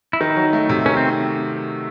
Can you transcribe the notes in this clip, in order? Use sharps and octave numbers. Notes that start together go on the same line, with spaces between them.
E4
D#3 D#4
F#3
A3
C3
D#3 C#4
C4